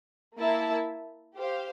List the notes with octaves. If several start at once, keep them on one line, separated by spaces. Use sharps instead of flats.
A#3 E4 A#4 E5 A5
G4 C5 F5